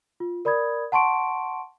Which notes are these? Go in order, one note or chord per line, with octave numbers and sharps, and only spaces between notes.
F4
A#4 D5 B5 D#6 G#6
F#5 A5 C6 C#6 D7